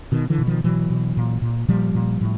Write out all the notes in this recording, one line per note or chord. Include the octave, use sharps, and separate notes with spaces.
B2 D#3
D3 E3
B2
D#3 F3
B2 E3 F#3
B2
A#2
A#2
A#2 F3 G3
A#2
A2